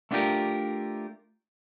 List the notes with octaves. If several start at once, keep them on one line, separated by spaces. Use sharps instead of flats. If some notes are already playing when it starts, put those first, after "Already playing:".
A3 B3 D4 F4 G4 A#4